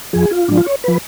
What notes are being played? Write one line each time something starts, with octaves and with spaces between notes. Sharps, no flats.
F2 F3 G#4
F4
G#2 F3 D4
F4
C#5
F3 B4